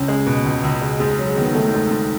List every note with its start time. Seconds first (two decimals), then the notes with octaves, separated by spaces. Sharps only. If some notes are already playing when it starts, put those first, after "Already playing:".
Already playing: C#2 C#4
0.08 G#3
0.26 B2
0.45 C#2
0.63 C#2
0.81 G#3
0.99 G#2 G#4
1.18 F#3
1.27 G#4
1.36 D#3 B3
1.54 D#3 A3
1.73 G#2
1.91 G#2